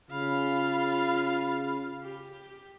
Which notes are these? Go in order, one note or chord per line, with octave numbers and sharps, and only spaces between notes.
C#3 F4 F5 B5
G4